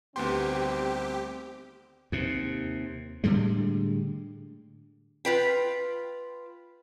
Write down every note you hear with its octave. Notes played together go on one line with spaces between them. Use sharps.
D2 D#3 G3 B3 C4 G4 C6
D#2 C3
A2 D3 G3 G#3
F4 B4 G5